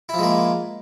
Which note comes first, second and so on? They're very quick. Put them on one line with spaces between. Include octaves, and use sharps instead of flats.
E4 F3 G#3 A#3